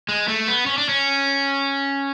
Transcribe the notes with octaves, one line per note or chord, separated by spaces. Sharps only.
G#3
A3
B3
C#4
D4
C#4